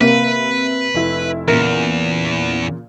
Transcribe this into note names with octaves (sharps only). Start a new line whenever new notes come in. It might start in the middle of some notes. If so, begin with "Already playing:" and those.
C3 A#3 B4
F1 E4
E2 A#2 C#3 A#4